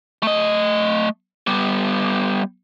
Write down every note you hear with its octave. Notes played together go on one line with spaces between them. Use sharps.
A3 D#5
G3 B3